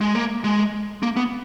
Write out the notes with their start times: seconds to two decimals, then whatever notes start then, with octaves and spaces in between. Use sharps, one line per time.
0.01 G#3
0.15 A#3
0.44 G#3
1.03 A#3
1.17 B3